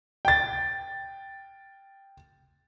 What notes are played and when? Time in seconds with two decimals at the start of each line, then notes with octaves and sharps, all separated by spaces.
0.25 G5 A6